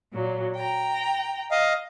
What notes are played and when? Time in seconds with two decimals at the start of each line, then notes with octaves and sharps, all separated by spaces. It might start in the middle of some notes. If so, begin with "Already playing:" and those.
0.11 A#2 F#3
0.55 G5 A#5
1.51 D#5 F5